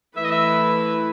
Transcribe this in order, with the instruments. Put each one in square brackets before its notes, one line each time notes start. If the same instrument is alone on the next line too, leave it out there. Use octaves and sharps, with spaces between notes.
[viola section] E3 A3 E4 B4 [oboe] E5
[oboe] D#5
E5